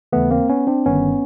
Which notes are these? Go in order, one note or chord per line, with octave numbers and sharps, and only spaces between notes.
D#2 C#3 E3 A3 B3
A#3 C4
B3 C#4
C4 D4
G1 G2 D#3 B3 C#4